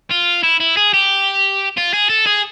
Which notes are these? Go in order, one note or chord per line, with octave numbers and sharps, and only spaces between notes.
F4
E4
E4
G#4
G4
F4
G#4
A4
G#4